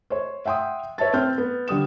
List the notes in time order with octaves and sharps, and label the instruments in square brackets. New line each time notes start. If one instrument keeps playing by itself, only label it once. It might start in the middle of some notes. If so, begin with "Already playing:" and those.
[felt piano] C5 C#5
E5 F#5 G5 C6 D#6
B4 C#5 E5 A5 A6
C4 F6 G6
B3
D3 G3 D#6 E7